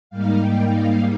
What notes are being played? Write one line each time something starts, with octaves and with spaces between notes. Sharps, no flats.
G#2 G3 A#3 D#4 F5
G5
F5